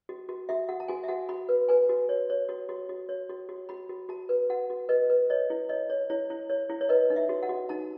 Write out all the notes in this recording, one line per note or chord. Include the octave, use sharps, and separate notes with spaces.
F#4
F#4
F#4 E5
F#4 F#5
A5
F#4 G#5
E5
F#4 F#5
F#4 B5
B4
B4 G#5
F#4
C#5
C#5
F#4
F#4
F#4
C#5
F#4
F#4
F#4 B5
F#4
F#4 A5
B4
F#4 F#5
F#4
B4 D#5
B4
C#5 D#5
E4
C#5 D#5
C#5
E4 C#5
E4
C#5
E4
C#5
B4 D#5
D#4
E5
F#4
F#5
F#4
D#4 A5